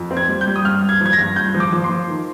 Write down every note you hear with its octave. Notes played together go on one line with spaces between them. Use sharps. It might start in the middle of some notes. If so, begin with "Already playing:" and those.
Already playing: F2
C4
G#6
G3
G6
G3
D#6
G2 F6
G2
G#6
F3 G#6
A#6
G2
G2 G6
F3
D6
F3
C6
F3
D#3